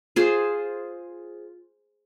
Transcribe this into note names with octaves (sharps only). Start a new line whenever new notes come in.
F4 G#4 C5